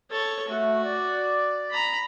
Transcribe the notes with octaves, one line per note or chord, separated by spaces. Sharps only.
A4 C#5
A3 F#4
D5
A#5 B5